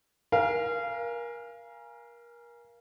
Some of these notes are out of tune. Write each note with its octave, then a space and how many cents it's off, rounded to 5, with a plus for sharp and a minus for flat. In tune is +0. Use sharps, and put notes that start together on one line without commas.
A#4 +25 F5 -20 G#5 -5